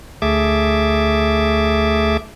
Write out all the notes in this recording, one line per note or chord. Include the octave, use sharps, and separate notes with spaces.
D2 A3 G#4 E5 D6